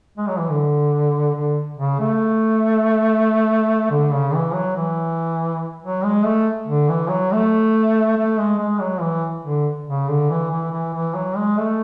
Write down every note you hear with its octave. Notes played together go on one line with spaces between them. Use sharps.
G#3
F#3
E3
D3
D3
C#3
A3
D3
C#3
E3
F#3
E3
F#3
G#3
A3
D3
E3
F#3
A3
A3
G#3
G#3
F#3
E3
D3
C#3
D3
E3
E3
E3
E3
F#3
G#3
A3